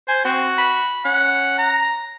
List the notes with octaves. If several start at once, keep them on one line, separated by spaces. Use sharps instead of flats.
C5 G#5
C4 F#4
B5
C#4 F#5
A#5